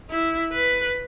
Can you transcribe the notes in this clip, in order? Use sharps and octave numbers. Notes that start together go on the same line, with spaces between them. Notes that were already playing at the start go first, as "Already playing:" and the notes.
E4
B4